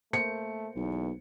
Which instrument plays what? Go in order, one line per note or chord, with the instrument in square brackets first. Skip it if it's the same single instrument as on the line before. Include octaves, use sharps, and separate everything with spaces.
[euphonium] A3 [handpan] A#3 C5 [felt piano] C#7
[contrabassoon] B1 [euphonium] E2